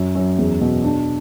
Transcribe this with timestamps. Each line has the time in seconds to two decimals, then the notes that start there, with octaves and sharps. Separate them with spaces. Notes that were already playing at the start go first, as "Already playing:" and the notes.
Already playing: F#2
0.15 F#2
0.38 E2
0.60 B2
0.84 D4